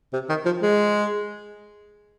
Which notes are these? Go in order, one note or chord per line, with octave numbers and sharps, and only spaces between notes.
C3
D#3
F3
G#3